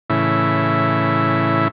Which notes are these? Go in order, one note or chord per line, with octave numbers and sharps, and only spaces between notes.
A2 C#3 E3 E4